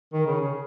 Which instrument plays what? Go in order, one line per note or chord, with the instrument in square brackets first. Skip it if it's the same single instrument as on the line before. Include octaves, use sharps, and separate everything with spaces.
[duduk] D#3
C#3
C#3